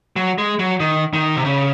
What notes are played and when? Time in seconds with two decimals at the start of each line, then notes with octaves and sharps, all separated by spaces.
0.16 F#3
0.38 G#3
0.59 F#3
0.80 D#3
1.13 D#3
1.36 C3
1.45 C#3